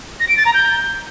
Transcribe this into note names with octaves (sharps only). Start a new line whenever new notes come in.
A#6
D7
A6
A#5
G6